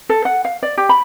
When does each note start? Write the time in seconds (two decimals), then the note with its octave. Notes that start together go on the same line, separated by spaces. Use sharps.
0.09 A4
0.25 F#5
0.45 F5
0.63 D5
0.77 G4
0.89 B5